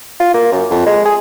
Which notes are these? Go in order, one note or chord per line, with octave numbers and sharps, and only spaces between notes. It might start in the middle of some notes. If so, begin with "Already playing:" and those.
F4
A#3
F#2
F2
G#3
G#4